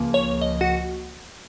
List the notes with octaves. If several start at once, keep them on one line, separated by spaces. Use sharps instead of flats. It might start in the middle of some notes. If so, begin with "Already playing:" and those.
Already playing: C#2 C#3 F3 A#3
C#5
D#5
F#4 F#5